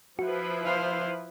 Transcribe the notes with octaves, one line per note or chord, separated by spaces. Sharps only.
F3 E4 F#4 B4
C5 F5